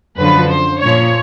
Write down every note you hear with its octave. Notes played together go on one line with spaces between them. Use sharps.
F#2 D3 F3 B4
C5
A#2 F3 C#5